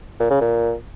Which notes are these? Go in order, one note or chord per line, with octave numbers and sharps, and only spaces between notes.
A#2
C#3
A#2